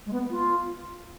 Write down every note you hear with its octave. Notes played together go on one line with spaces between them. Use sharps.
G#3
B3
F4